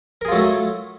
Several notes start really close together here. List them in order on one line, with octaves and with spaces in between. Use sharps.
A#4 G#4 F4 F#3 A3